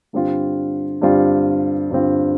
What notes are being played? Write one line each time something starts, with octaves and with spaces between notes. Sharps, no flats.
G2 D3 G3 C4 F4
G2 D3 G3 C4 F4
G2 D3 G3 C4 F4